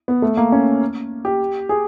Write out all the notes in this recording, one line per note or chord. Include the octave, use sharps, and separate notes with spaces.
B3
A3
A#3
C#4
G4
G#4